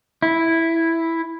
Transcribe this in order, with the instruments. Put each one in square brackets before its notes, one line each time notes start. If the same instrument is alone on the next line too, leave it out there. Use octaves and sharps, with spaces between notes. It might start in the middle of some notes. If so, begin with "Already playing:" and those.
[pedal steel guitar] E4